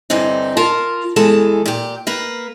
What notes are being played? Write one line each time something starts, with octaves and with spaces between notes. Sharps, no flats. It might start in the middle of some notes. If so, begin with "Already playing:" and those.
G2 D3 E3 C4 D#4
F4 A#4 A5
E2 E3 G#3 A4 A5
A#2 G4
A#3 A#4 B4